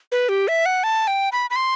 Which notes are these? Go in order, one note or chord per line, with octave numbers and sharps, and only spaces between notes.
B4
G4
E5
F#5
A5
G5
B5
B5
C6